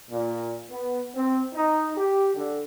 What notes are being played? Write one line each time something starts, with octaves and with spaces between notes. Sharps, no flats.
A#2
B3
C4
D#4
G4
D3